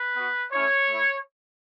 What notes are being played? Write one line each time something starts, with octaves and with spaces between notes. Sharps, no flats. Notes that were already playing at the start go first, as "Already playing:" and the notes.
Already playing: B4
B3 F#4
A3 C#4 E4 C#5
A3 E4